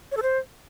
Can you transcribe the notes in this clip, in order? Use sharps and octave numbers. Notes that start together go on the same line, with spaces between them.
C#5
A4
C5